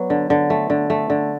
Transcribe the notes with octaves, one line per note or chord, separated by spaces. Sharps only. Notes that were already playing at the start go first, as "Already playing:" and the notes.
Already playing: F#3 B3 D5
D3
D3
A3
D3
A3
D3